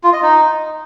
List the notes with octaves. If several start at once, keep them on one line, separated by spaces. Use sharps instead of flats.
F4
D#5
D#4